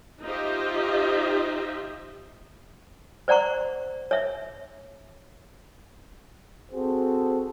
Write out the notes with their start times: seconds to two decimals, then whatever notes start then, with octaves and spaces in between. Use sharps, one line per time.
0.23 D#4 F4 G4 C5 D#5 E5
3.28 C5 D5 F#5 A#5 C#6
4.11 C#5 E5
6.72 C4 F#4 G#4 A4 C5